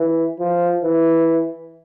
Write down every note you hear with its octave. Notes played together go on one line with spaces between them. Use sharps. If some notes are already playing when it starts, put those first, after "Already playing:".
Already playing: E3
F3
E3